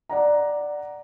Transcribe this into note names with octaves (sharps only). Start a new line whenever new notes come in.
D5 F#5 A#5